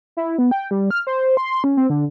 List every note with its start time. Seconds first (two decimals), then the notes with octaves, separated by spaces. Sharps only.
0.17 E4
0.38 B3
0.51 G5
0.71 G3
0.91 F6
1.07 C5
1.37 C6
1.51 C6
1.64 C#4
1.77 C4
1.90 D3